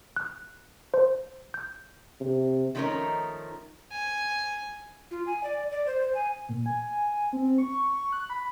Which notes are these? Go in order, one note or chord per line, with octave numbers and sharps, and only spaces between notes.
F#6
C5
G6
C3
D#3 F3 A3 C#4 D#4 A#4
G#5
F4
G#5
D5
D5
C5
C5
G#5
A#2
G#5
C4
C#6
F#6
B5